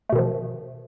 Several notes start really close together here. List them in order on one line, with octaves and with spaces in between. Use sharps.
A3 B2 D#3 F3